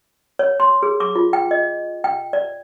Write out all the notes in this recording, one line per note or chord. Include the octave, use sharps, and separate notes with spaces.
C#5
C6
G#4
D6
F4
G5
D#5
G5
D5